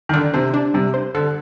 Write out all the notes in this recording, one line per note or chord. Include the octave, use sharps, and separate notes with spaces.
D#3
D3 D4
C3 C5
D4
C3 G3
C5
D3 A4